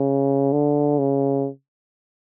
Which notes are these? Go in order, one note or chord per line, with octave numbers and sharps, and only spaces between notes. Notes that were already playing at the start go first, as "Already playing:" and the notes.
Already playing: C#3
D3
C#3